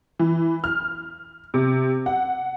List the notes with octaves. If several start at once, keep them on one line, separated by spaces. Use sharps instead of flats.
E3
F6
C3
F#5